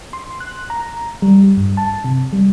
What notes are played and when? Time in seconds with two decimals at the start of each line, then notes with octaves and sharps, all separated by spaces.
0.13 C6
0.40 F#6
0.70 A#5
1.22 G3
1.57 G2
1.77 A5
2.04 C3
2.33 G3